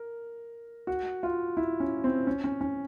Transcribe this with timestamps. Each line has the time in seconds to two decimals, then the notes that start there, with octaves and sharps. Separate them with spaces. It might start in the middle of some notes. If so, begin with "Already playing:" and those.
Already playing: A#4
0.87 F#4
1.23 F4
1.57 E4
1.80 C#4
2.04 C4
2.27 C#4
2.44 C#4
2.61 C#4